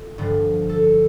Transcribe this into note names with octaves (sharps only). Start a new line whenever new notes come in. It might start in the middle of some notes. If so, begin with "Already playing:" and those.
Already playing: F4 A4
G2 D3 F3
A4